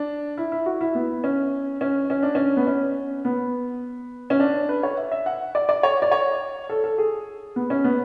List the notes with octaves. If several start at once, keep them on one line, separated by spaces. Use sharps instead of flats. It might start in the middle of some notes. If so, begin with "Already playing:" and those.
Already playing: D4
E4
E4
F#4
E4
B3
C#4
C#4
C#4
D4
C#4
B3
C#4
B3
C#4
D4
B4
C#5
E5
E5
F#5
D5
D5
C#5
D5
C#5
A4
A4
G#4
B3
C#4
B3